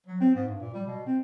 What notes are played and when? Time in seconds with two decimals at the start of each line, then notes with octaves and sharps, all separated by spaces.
0.06 F#3
0.21 C4
0.35 G#2
0.48 G2
0.61 A#2
0.74 G3
0.87 B2
1.06 C4